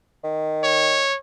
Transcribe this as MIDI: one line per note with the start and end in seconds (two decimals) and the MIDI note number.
0.24 1.08 51
0.64 1.17 73